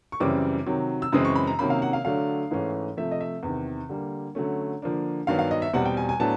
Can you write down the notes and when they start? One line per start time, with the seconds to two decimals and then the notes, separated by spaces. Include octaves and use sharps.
0.12 C#6
0.20 F#2 C#3 E3 G3 C4 D6
0.66 C3 D#3 F#3
1.02 E6
1.12 F#2 C#3 E3 G#3 C4 D#6
1.25 C#6
1.36 B5
1.47 A#5
1.59 C3 D#3 F#3 A#3 C#4 B5
1.70 F5
1.82 F#5
1.93 F5
2.05 D3 F#3 A3 D4 F5
2.51 G#2 E3 A3 C#4
2.97 C3 F3 A3 E5
3.12 D#5
3.21 E5
3.43 E2 C3 D#3
3.89 D3 G3 A#3
4.35 D3 F#3 A3 C#4
4.82 D3 F3 A#3 D4
5.27 G2 D#3 F#3 B3 D4 F5
5.39 F5
5.51 D#5
5.62 E5
5.73 E2 B2 G3 C4 F#5
5.86 G5
5.97 G#5
6.09 G#5
6.20 A2 F#3 B3 D4 A5